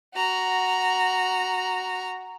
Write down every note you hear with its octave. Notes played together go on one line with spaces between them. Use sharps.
F#4 A#5